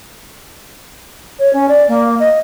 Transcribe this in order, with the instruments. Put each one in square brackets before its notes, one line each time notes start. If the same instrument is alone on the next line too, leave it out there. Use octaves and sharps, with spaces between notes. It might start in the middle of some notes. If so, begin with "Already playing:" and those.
[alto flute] C#5
C#4
D5
A#3
D#5